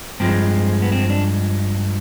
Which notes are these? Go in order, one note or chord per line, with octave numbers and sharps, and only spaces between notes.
G2 F3 G#3 C4
B3
C4
D4